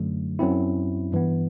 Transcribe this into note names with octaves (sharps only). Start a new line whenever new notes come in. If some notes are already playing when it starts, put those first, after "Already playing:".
Already playing: F#2 D3 F#3 A3
F#2 F#3 C4 E4
G2 E3 B3